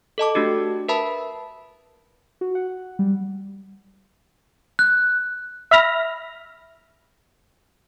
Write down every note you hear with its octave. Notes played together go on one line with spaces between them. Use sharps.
A4 D#5 A5 D6
A3 D4 F#4 G4
A#4 B4 E5 A5 B5
F#4
F#5
G3
F#6
E5 B5 F6 A#6